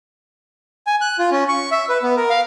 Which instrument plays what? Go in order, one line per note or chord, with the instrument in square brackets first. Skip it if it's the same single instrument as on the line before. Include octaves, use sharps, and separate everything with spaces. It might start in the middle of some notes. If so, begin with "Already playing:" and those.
[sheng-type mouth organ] G#5
F#6
F4
C#4
C#6
E5
B4
B3
A#4
F5